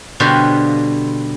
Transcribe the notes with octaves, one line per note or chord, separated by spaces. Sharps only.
B2 D3 G3 B4 C5 F5